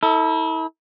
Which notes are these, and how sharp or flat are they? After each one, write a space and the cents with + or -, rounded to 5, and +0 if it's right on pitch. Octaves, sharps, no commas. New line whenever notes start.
E4 -35 A4 +20